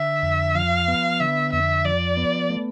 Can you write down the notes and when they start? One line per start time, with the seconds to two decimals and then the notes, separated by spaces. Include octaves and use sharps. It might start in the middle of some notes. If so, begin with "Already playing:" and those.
Already playing: D3 E5
0.23 F2
0.55 F3 F5
0.88 B3
1.20 D3 E5
1.52 F2 E5
1.84 F3 D5
2.17 B3
2.50 A3